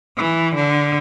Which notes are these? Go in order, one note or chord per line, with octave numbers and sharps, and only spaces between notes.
E3
D3